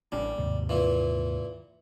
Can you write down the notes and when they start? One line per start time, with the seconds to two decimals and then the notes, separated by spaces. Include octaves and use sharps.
0.12 A1 G3 C#4 D4
0.38 D#2 G#2 C3
0.69 A#2 E3